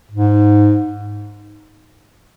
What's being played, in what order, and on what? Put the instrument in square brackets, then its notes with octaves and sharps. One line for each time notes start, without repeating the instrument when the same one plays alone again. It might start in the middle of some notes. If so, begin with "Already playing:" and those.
[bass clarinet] G#2